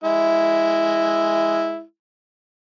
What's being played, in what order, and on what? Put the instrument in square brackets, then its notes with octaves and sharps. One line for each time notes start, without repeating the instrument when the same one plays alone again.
[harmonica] G#3 E4